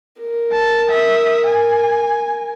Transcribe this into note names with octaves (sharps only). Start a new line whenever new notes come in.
A#4
A5
E5 D#6
G#5